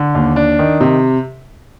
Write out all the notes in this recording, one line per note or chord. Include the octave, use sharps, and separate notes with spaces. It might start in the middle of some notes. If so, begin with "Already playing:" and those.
Already playing: D3
D#2
D4
D#3
C3